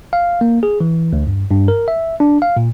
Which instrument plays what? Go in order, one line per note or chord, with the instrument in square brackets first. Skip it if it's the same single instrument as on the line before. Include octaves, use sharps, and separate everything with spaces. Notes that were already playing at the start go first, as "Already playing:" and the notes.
[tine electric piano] F5
A#3
G#4
E3
D2
G2
G2
A#4
E5
D4
F5
A#2